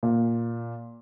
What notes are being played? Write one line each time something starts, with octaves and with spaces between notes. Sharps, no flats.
A#2